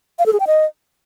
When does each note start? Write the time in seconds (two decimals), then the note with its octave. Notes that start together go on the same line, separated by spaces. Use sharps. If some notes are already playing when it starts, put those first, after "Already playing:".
0.19 F5
0.26 A4
0.33 G#4
0.40 G5
0.47 D#5